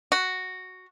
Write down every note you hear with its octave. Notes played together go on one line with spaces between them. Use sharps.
F#4